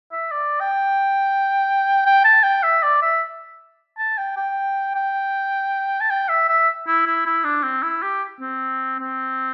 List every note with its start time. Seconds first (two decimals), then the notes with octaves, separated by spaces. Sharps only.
0.12 E5
0.31 D5
0.60 G5
2.06 G5
2.24 A5
2.43 G5
2.63 E5
2.83 D5
3.02 E5
3.98 A5
4.18 G5
4.37 G5
4.95 G5
6.01 A5
6.10 G5
6.29 E5
6.49 E5
6.87 E4
7.06 E4
7.26 E4
7.44 D4
7.63 C4
7.83 E4
8.02 G4
8.40 C4
8.99 C4